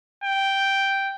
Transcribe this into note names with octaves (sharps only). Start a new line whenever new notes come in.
G5